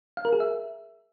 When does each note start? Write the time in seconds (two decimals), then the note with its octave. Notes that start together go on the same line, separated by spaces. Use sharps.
0.17 F5
0.25 A#4
0.33 G#4
0.40 E5